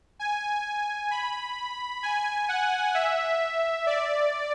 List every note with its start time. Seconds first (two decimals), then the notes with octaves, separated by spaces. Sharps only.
0.19 G#5
1.11 B5
2.03 G#5
2.49 F#5
2.95 E5
3.87 D5